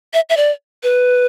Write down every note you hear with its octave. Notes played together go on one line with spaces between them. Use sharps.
E5
E5
D5
B4